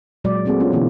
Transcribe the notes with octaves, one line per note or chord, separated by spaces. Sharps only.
A#2 F#3 G#3 D5
A3 A#3 C4 F#4 G#4
B3 C#4 F4
B2 D3 E3 A#3 B3